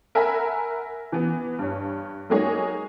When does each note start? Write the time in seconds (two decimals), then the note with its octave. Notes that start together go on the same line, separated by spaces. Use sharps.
0.15 A#4 E5 F#5 G#5 A#5 B5
1.12 E3 B3
1.59 G2 C#5
2.29 F#3 G#3 A#3 D#4 G#4 C#5